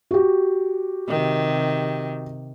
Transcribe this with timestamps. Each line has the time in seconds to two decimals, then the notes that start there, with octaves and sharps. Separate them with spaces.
0.11 F#4 G4
1.09 C3 D#3